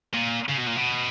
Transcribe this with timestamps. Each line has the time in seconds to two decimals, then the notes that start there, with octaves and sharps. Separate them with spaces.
0.13 A#2
0.49 C#3
0.58 B2
0.67 A#2
0.77 B2